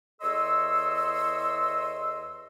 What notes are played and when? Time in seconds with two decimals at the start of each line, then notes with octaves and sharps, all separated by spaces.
0.21 E2 A4 C#5 D#5 C6 E6